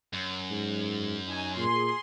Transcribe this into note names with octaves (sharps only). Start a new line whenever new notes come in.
F#2
G#2
D#4 G#5
A#2 G#4 C6